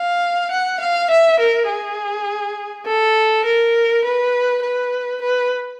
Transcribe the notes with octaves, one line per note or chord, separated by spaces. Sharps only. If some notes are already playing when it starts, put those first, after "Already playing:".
Already playing: F5
F#5
F5
E5
A#4
G#4
A4
A#4
B4
B4
B4